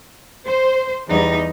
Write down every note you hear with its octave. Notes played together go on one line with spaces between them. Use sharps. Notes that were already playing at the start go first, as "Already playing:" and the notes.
C5
E2 G3 D#4